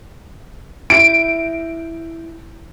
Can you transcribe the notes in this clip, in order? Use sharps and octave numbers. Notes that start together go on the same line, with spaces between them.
E4 D7